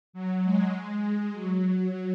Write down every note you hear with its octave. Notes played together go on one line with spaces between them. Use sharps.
F#3
G#3
G#3
F#3